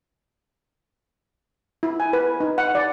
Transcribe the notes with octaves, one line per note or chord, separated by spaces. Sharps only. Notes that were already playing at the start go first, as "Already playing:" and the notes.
E4
G#5
B4
D#4
F#5
D5